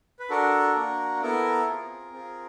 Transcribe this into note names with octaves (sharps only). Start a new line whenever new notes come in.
B4
D4 F#4 A4 A#4
A#3 D4 F#4
B3 E4 A4 A#4
C4 F4 G#4
C4 F4 G#4